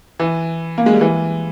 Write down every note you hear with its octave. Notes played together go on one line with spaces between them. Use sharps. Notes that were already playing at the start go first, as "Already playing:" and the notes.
E3
A#3
G#3
G3
E3